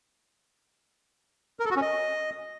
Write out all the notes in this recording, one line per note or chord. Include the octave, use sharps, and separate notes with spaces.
A#4
A4
F#4
C#4
D#5